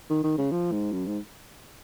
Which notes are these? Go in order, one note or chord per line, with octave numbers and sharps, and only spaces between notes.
D#3
D#3
C#3
F3
G#2
F#2
G#2